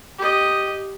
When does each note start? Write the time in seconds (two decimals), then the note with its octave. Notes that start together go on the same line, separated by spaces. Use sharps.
0.18 G4 D#5